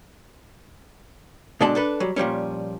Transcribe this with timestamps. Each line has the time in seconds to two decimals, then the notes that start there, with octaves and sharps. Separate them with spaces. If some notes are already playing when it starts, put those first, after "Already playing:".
1.60 B2 D3 G#3 D5 A5
1.75 D4 A4 B4
2.00 F#3 G3
2.16 A#2 F3 G3 C#4